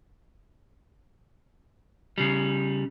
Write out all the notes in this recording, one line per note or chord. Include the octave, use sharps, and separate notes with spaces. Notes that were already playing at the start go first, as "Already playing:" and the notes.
C#3 G3